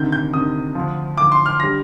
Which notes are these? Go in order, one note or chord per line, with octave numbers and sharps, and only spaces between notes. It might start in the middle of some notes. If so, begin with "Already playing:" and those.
Already playing: D2 C3 D#3 G6
G6
D2 C3 D#3 D#6
D2 D3 F3
D2 D3 F3 D6
C6
F6
D3 G3 A#6